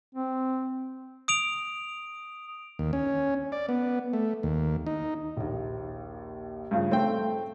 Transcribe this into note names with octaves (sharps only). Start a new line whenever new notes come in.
C4
D#6 D7 F7
D#2
C#4
D5
B3
A3
D#2
D#4
A#1 D#2
G2 C#3 F3
A3 C4 G5